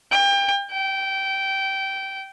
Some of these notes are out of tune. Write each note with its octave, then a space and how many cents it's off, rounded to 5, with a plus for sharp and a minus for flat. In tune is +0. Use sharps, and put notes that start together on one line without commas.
G5 +30
G5 -15